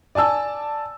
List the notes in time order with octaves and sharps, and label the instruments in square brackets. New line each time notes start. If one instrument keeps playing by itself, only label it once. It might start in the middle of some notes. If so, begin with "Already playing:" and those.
[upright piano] D5 G#5 A5 E6